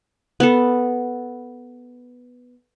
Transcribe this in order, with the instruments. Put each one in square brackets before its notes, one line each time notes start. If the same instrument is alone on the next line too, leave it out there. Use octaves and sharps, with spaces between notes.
[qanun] B3 A4